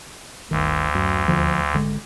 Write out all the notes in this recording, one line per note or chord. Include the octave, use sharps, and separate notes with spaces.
G1 D2 D#3
F#2
D#2 D3 F3
G#1 D3 G#3